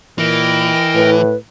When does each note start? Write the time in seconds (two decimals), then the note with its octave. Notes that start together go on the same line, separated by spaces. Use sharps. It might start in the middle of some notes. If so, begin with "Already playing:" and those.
0.18 A#2 E3 A#4 D#5 G5
0.94 A2 B4